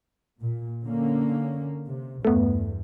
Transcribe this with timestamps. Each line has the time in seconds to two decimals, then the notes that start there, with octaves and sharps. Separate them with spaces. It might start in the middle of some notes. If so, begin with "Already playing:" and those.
0.42 A#2
0.85 D3 A#3 C#4
1.87 C3
2.25 E2 G2 A3 B3